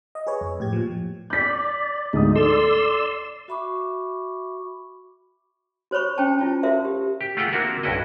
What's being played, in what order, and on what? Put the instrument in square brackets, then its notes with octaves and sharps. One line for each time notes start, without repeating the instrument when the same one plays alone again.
[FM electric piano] D#5
G#4 B4 C#5
F2
A2 G4 G#6
A#2 F3
[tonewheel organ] D5 [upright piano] G6 B6
[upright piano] D2 G#2 D#6 [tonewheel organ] D#4
[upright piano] A4 [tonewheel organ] D5 C6 E6
[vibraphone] F#4 E5 B5 C#6 D6
[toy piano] F#4 C5 C#5 B5 C#6
C#4 C5 G5 A5
E4 F4 A5
F#4 A#4 C5 E5 F5
G4
[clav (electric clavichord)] G4
A3 F4 G4 G#4 F#5 G5
A#3 C4 D4 E4 F#4 A#4
B1 G2 C#4 E4 F#4 D#5